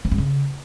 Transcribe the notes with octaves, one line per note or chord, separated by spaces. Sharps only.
F3
G2
C#3